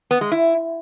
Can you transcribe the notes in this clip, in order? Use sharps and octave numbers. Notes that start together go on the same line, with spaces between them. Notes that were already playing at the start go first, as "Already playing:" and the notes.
B3
G#3
E4